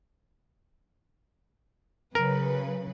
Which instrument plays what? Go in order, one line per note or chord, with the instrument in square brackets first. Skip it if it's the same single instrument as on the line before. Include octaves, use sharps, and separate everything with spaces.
[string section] C#3 F#3 B4 [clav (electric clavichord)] A#4